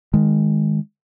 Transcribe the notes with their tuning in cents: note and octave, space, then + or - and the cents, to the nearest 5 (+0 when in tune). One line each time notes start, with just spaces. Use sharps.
D#3 +0 G#3 +0